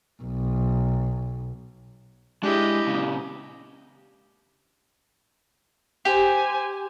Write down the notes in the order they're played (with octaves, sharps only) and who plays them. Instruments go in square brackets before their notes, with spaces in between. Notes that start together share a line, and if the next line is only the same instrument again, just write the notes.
[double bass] B1
[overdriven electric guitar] G#3 [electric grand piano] D4 E4 [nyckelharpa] G4 D#5
[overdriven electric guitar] A#2 C#3
[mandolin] G4 [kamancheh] C5 G#5